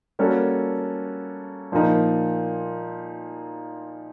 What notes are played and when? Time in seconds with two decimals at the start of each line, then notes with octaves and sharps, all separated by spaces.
0.19 G3 A#3 C#4 F#4 A4
1.72 A#2 F3 A#3 D#4